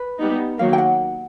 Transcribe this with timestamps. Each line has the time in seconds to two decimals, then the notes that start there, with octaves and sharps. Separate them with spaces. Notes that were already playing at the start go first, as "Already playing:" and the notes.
Already playing: B4
0.19 G3 B3 D#4
0.59 D#3 F#3 A#3 F5
0.73 G5
0.78 F#5